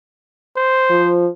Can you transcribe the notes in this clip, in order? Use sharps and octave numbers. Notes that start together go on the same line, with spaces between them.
C5
F3